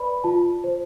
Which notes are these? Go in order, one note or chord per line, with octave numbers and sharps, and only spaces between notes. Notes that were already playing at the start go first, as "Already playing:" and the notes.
Already playing: B4 D5 B5
F4 A5
C5